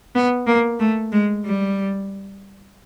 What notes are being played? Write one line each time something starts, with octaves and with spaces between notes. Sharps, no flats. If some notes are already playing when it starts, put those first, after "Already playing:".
B3
A#3
A3
G#3
G3